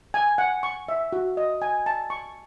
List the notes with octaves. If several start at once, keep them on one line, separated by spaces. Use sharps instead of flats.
G#5
F#5
C#6
E5
F#4
D#5
G#5
A5
C#6